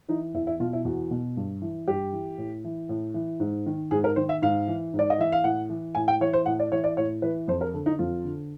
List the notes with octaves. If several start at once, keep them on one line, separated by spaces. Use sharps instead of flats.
E3 D#4
E2 E4
E4
B2 F4
E4
E2 F#4
B2
G2
E3
G2 G4
E3
A2
E3
A2
E3
G#2
D#3
G#2 G#4
A#4
D#3 C5
E5
G#2 F5
E3
G#2
D5
D#5
E3 E5
F5
A2 F#5
E3
A2 G#5
G5
E3 C#5
C5
A2 F#5
D5
E3 C#5
D5
A2 C#5
E3 B4
F2 C5
A#4
D3 A4
D#4
F2 F4
D3